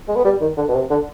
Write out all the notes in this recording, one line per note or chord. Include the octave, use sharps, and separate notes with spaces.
G#3
B3
G3
D#3
D3
B2
C3
D3